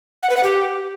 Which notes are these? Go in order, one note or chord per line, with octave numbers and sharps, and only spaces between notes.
F#5
B4
F#5
G4